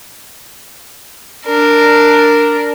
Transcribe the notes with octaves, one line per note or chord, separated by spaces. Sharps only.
D4 A#4